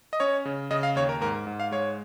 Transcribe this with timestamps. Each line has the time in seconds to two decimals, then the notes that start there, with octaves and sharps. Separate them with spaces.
0.13 D#5
0.20 C#4 C#5
0.45 C#3
0.71 C#3 D#5
0.83 F5
0.96 D#2 C#5
1.09 A#4
1.21 G#2 A#4
1.47 G#2
1.60 F5
1.71 G#3 C#5